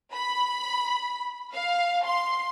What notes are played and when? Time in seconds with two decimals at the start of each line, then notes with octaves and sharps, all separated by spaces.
0.14 B5
1.53 F5
2.04 C6